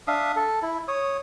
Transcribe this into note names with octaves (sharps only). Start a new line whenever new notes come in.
D4 E5 F5 D#6
A4
E4
C#5 D#6